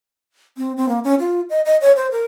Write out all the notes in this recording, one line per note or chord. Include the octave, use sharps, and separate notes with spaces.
C4
C4
A#3
C#4
F4
D#5
D#5
C#5
C5
A#4